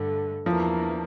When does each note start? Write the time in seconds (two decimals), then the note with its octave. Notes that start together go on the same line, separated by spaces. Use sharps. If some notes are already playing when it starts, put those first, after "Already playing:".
Already playing: G2 D3 A3
0.46 E2 E3 F3 A#3 D4